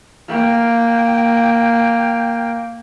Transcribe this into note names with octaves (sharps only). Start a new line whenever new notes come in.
A#3 G5